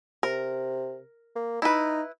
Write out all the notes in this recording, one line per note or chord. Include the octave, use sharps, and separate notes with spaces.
C3 A#4
A#3
D#4 E4 B4